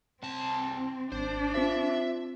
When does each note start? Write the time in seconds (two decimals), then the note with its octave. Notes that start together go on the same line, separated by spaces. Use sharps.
0.23 C2 C4 A5
1.12 G#1 D4 C5
1.55 C4 F4 C5 E5